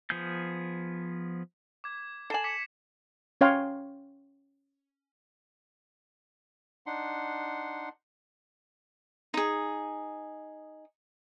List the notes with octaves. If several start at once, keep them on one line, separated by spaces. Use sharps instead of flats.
F3 B3 G#4 F5 G6
D6 G#6
A4 G#5 C7 E7 F#7
D6 B6 C#7
C#4 C#5 F5 G5 C6
D4 D#4 F#5 C6
D#4 G#4